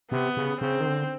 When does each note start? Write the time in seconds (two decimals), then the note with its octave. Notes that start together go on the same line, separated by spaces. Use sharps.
0.11 C3 B3
0.37 C#3
0.61 C#3 C4
0.80 D#3
0.86 D3